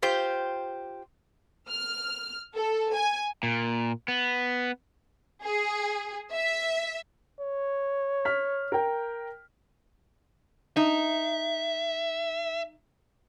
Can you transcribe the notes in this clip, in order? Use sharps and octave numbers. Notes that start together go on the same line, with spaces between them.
F4 G4 C5
F6
A4
G#5
A#2
B3
G#4
E5
C#5
F6 B6
A#4 G5
D#4 E5